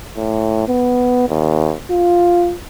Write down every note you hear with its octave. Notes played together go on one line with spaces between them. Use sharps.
A2
B3
D#2
F4